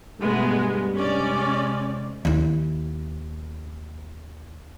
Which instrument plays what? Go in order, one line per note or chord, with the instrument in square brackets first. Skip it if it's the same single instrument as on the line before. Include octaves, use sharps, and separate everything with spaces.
[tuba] G2 [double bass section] B2 A3 [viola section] G#3 B3
[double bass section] C3 G#3 [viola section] C#4 D5
[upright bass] D#2 E4